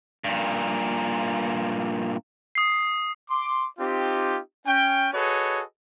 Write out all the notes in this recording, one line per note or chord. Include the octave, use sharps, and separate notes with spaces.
G2 A#2
D#6 C7
C6 D6
C4 D#4 F4 G4
C#4 G5
F#4 G#4 A4 B4 C#5 D#5